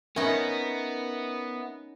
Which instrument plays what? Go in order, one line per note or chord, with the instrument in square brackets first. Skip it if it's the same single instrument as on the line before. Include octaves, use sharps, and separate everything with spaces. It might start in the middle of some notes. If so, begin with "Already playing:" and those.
[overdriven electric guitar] B3 [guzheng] C#4 D#4 [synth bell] A#4 E5 A#6